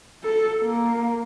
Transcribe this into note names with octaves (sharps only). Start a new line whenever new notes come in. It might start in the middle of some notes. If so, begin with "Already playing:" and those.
A4
A#3